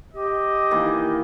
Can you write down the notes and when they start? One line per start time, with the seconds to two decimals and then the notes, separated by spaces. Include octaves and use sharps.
0.14 G4 D#5
0.71 D#3 E3 A#3